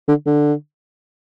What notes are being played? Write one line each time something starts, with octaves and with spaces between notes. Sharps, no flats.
D3
D3